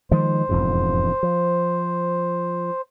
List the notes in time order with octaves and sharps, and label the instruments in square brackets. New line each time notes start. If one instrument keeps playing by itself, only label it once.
[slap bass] D#3 F3 G#3 [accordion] C5
[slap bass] E1 F2 G#2
F3